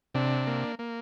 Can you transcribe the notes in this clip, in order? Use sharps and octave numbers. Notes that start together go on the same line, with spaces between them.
C3 D4
A#3
A#3